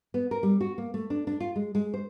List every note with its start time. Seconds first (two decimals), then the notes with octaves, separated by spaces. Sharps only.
0.14 B3
0.31 A#4
0.43 G3
0.61 F#4
0.78 A#3
0.94 A3
1.10 D4
1.27 D4
1.40 F4
1.56 G#3
1.75 G#3
1.94 C5